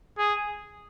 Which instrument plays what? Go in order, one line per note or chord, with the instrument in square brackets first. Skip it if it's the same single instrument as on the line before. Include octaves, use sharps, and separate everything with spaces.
[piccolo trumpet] G#4